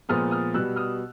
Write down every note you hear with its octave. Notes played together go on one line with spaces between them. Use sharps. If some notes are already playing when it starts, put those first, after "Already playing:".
A#2 F3 G#3 B3 D#6 F6
D#6 F6
B2 G3 B3 E6 F#6
D#6 F6